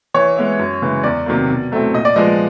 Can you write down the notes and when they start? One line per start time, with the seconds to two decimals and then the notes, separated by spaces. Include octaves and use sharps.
0.14 E3 C#5
0.36 G#3 B3 E4
0.59 F#2
0.82 C#3 E3 G#3
1.03 E2 D5
1.26 C3 D#3 F#3 A#3
1.49 B2
1.72 F#3 A3 C4 E4
1.93 A#2 D#5
2.05 D5
2.16 F3 G#3 B3 D#5